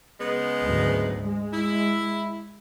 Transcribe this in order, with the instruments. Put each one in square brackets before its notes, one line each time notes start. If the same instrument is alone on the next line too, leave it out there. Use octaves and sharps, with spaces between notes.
[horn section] C#3 G#3 B3
[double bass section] D2 G#2 F#3
G#3
[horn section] E4